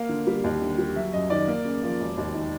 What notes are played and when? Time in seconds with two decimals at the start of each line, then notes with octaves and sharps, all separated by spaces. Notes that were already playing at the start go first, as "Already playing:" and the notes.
Already playing: A#3 F5
0.09 D3
0.27 G3
0.44 D#2
0.61 D3
0.78 G3
0.96 F#3 E5
1.13 F#2 D#5
1.30 D#3 D5
1.48 A#3
1.65 C#3
1.83 F3
2.00 E1
2.18 D#2
2.34 D#3